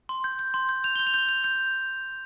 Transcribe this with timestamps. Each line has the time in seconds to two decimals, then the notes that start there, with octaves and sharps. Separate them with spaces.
0.09 C6
0.24 G6
0.39 G6
0.54 C6
0.69 G6
0.84 G6 F7
0.96 G6 G7
1.07 F7
1.14 G6 G7
1.29 G6 F7
1.44 G6